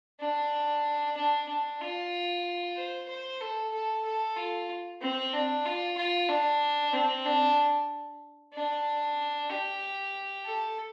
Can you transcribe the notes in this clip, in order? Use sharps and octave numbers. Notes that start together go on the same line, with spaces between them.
D4
D4
D4
F4
C5
C5
A4
A4
A4
F4
C4
D4
F4
F4
D4
C4
D4
D4
G4
A4